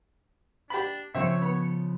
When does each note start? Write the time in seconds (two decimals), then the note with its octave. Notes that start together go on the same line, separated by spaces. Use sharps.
0.70 D4 G4 B5
1.15 C#3 F3 C4 C#5 E5
1.42 B3